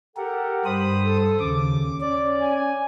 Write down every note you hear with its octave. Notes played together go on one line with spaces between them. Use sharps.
G4 A4 A#4 F#5
G2 C5 B5 D#6
A4
D#2 C#3 D6
C#4 D5
G#5